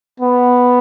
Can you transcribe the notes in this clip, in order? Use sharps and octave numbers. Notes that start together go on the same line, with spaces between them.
B3